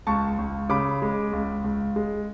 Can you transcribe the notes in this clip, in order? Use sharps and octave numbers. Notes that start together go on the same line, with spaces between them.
C#2 A5 C#6
C#2
C#3 B5 D6
G#3
C#2
C#2
G#3